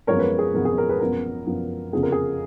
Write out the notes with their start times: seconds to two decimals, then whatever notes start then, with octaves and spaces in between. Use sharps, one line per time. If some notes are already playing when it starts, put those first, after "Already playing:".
0.07 G#1 F#2 F3 G#3 B3 A#4 C#5
0.19 B4
0.23 A#4
0.39 G#4
0.54 G#1 F#2 F3 G#3 B3 A#4
0.65 G#4
0.78 A#4
0.89 G#4 B4
1.00 F#2 F3 B3 A#4
1.46 F#2 F3 B3
1.92 F2 C#3 F3 B3 G#4
2.03 A#4
2.12 G#4